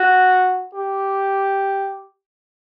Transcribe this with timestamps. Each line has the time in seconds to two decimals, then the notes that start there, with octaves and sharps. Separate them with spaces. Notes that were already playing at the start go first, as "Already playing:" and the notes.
Already playing: F#4
0.75 G4